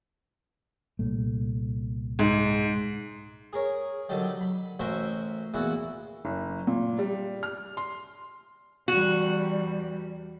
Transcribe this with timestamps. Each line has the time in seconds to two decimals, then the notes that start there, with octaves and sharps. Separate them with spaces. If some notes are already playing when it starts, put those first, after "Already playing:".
0.99 C2 A#2 A3
2.19 G#2
3.53 G#4 A#4 C#5
4.09 D3 D#3 F#3 G3
4.41 B5
4.79 A1 F#4 A#4 C5 E5 C#6
5.54 E2 A#2 E4 F#4 F#5
6.25 F#1
6.67 A#2
6.99 G3
7.43 F6
7.77 C6
8.88 E2 G3 F#4